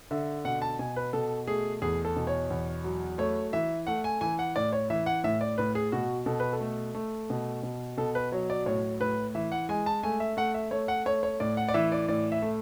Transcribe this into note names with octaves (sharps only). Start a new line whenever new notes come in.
D3 E5
B2 F#5
A5
B2 G#5
B4
B2 A4
A3 G#4
E2 G#4
A4
B2
C#5
E2
F#3
A3 C#5
E3 E5
A3 F#5
G#5
E3 G#5
F#5
A2 D5
C#5
E3 E5
F#5
A2 E5
D5
A2 B4
G#4
B2 F#4
B2 A4
B4
A4
A3
A3
B2
B2
B2 A4
B4
F#3 C#5
D5
A2 C#5
A2 B4
E3 E5
F#5
G#3 G#5
A5
A3 G#5
E5
A3 F#5
E5
A3 C#5
F#5
A3 C#5
C#5
A2 D5
F#5
D5
E3 E5
D5
A2 D5
E5
A3